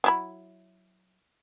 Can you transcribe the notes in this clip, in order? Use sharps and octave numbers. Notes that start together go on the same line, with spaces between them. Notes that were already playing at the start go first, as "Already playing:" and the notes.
F#3 E4 B5